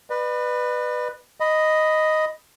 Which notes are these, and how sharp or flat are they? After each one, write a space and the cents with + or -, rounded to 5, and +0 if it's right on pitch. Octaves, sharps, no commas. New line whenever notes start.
B4 +0 D5 +45
D#5 +0 B5 +5